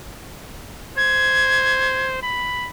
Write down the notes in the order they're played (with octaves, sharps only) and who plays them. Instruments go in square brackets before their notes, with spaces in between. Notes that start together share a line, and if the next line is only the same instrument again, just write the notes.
[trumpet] C5 [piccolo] G#6
[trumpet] B5